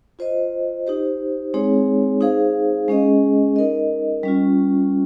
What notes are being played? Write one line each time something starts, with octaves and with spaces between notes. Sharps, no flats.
F4 C5 D#5
D#4 G4 C5
G#3 C4 D#4 G#4 C#5
D#4 G#4 C5 F5
G#3 C#4 G#4 D#5
D#4 A#4 D#5
G3 C#4 F4